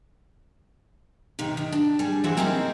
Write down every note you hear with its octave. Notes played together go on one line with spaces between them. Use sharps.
C3 D#3
D#3
D4
G3 G#4
C3 E3 C4 E4 F#4 G#4
A#3 C4 C#4 D#4 G#4 C5